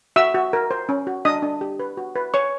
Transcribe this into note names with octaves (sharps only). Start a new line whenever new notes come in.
F#4 E5 E6
F#4
A#4
C5
C#4
F#4
D4 D#5 D#6
D4
G4
B4
F#4
B4
C#5 C#6